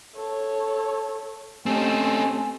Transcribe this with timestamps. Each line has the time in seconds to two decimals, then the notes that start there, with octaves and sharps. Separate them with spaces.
0.15 A4 C#5
1.66 A3 C4 C#4 G4 D#5 G#5